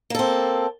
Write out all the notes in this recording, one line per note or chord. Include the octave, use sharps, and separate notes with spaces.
A#3 C4 A4